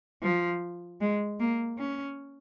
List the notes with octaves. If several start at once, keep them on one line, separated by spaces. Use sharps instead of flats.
F3
G#3
A#3
C#4